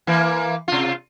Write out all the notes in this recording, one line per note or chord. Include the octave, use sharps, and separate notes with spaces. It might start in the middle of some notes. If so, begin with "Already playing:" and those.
E3 A#3
C3 F4